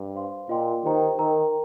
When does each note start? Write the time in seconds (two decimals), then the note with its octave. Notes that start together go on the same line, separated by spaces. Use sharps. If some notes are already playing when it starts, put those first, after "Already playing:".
Already playing: G2
0.14 C5 F5 C6
0.49 A#2 F4 D#5 G5 C6
0.84 D#3 G4 C5 G5 A#5
1.18 D#3 A#4 G5 A#5